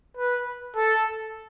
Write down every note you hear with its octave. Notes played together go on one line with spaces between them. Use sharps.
B4
A4